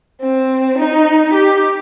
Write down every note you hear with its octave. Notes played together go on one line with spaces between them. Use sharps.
C4
D#4
G4